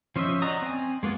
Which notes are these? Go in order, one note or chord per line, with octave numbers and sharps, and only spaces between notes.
F3 C#4 C5 D#5 E5
F#4 D5 D#5 A#5 D#6
C4 G#5
G#3 A#3 B3 F4